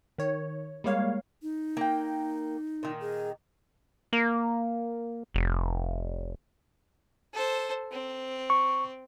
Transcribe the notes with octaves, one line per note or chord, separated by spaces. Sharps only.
D#3 C#5
G3 G#3 A#3 C#5 F5
D#4
A#3 G5
A#2 D#3
G#4
A#3
F1
A4 C5
C4
C#6